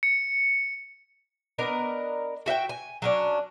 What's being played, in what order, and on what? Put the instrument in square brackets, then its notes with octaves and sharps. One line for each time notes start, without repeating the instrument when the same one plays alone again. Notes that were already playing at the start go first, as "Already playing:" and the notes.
[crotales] C#7
[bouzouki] B3 D4 A#4 D#5
F#4 E5 F#5 G5
G#5
F#3 C#4 D4